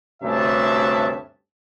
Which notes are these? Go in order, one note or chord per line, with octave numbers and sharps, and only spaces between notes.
D2 G2 C3 C#4 E5 A5